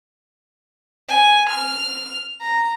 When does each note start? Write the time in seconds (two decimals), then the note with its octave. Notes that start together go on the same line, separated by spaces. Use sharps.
1.08 G#5
1.50 F6
2.41 A#5